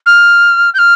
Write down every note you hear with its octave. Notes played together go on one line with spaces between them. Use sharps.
F6
G6
F6